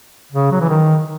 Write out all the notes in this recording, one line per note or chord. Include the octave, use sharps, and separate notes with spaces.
C#3
F#3
E3
D#3